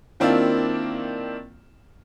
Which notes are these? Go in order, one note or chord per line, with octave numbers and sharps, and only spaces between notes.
D#3 A#3 C4 D4 E4 F4